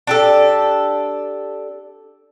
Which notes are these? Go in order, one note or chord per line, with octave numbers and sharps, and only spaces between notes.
D4 G4 A4